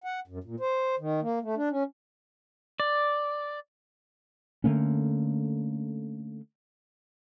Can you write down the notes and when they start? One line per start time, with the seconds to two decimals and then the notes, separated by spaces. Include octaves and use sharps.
0.04 F#5
0.28 F#2
0.44 A#2
0.60 C5
0.99 D#3
1.22 A#3
1.42 A3
1.56 D4
1.70 C#4
2.80 D5
4.64 D3 A3 A#3 C#4